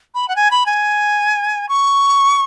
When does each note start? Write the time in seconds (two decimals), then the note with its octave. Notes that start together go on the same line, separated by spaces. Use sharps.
0.15 B5
0.28 F#5
0.36 G#5
0.51 B5
0.66 G#5
1.69 C#6